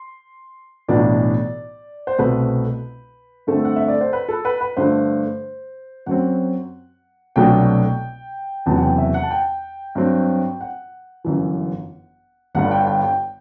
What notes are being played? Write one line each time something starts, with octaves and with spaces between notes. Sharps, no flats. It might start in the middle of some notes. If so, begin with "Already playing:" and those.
Already playing: C6
B1 A2 E3 B3 D4 D5
C5
C2 B2 A3 C4 B4
G2 D3 A3 C4 A4
F#5
E5
D5
C5
B4
A4
B4
B4
G2 D3 A3 C5
F#2 F#3 C4 F#5
C2 B2 F#3 A3 D4 G5
F#1 E2 C3 F#3 A5
F#5
G5
E5
F#5
A5
G5
G2 F#3 C4
F#5
G1 F#2 E3
G1 G2 D3 G3 F#5
G5
G5
G5